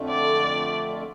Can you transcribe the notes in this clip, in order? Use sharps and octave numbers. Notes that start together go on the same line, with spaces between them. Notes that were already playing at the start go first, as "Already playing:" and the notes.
Already playing: F2 D3 A3
D5